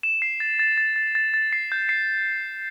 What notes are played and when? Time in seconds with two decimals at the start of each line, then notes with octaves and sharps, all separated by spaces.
0.03 E7
0.22 C7
0.40 A6
0.59 A6
0.78 A6
0.96 A6
1.15 A6
1.34 A6
1.52 C7
1.72 G6
1.89 C7